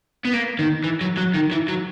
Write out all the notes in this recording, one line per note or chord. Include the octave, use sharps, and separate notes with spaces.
B3
A#3
D#3
E3
F#3
F#3
D#3
E3
F#3